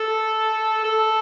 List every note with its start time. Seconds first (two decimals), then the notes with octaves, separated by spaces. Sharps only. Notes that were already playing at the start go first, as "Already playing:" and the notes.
Already playing: A4
0.84 A4